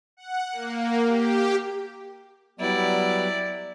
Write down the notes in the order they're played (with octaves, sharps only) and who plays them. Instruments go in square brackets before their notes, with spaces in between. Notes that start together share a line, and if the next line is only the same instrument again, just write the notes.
[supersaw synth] F#5
A#3
G4
[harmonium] F#3 G3 B3 [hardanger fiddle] E4 D5